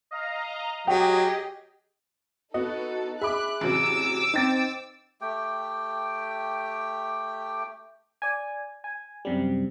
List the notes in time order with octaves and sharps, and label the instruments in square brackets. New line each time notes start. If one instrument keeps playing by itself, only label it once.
[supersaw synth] D#5 F5 A#5
[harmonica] F#3 [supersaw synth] G4 G#4 D#5 [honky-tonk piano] G5
[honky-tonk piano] B3 F#4 [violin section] D#4 A4 [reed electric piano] D#5
[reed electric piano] G#4 [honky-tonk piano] E5 B5 D6 [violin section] F#6
[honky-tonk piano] A1 C3 F#3 [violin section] D6 E6
[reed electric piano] C4 D#4 [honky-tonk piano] C5 G5 A6
[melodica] A3 G4 G5
[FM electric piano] D5 G#5
G#5
F#2 C3 G3